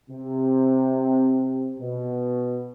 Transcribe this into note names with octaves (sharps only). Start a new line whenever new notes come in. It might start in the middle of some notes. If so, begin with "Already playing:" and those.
C3
B2